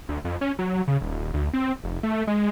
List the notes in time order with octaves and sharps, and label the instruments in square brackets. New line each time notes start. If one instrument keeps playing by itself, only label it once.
[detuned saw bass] D2
F2
C#4
F#3
C#3
D#1
D2
C4
F1
A3
G#3